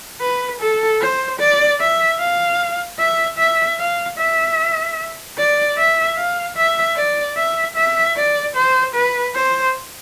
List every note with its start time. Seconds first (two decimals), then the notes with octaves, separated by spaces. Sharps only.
0.21 B4
0.60 A4
1.01 C5
1.40 D5
1.80 E5
2.20 F5
2.99 E5
3.38 E5
3.79 F5
4.18 E5
5.38 D5
5.78 E5
6.18 F5
6.56 E5
6.96 D5
7.37 E5
7.76 E5
8.16 D5
8.56 C5
8.95 B4
9.35 C5